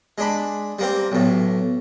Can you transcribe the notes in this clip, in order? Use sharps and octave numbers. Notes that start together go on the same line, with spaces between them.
G#3 D4 B5
G3 A#3 C4
B1 A2